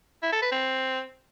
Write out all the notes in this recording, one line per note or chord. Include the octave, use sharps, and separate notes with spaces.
E4
A4
B4
C4